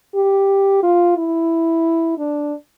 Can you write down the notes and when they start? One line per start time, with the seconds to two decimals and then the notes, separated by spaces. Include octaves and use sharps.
0.15 G4
0.83 F4
1.17 E4
2.18 D4